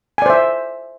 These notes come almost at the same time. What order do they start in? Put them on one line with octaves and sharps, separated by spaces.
G#5 D5 C5 E5